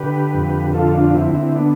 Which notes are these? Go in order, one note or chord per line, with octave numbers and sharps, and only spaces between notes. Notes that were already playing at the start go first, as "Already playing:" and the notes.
Already playing: D3 G4 B4
F2
D3 F4 A4
D4 F4
D3 C4 E4
C4 E4
B3 D4